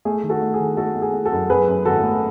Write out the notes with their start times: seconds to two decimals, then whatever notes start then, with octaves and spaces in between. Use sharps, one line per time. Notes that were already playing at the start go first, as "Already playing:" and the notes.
0.05 A3 G#4
0.24 D#3
0.29 F#4 A4
0.42 A3
0.54 G#4
0.60 D#3
0.77 A3 F#4 A4
0.96 A3
1.02 G#4
1.14 A3
1.25 F#4 A4
1.32 F#2
1.50 F#2 G#4 B4
1.68 F#2
1.85 G#1 F#4 A4
2.03 A3